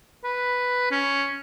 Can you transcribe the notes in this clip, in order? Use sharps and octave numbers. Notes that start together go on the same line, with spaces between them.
B4
C#4